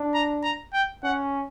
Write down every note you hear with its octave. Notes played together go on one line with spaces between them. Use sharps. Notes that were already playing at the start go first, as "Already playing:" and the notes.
Already playing: D4
A#5
A#5
G5
C#4 F#5